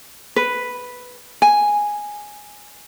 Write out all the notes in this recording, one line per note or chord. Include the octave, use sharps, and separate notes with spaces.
B4
G#5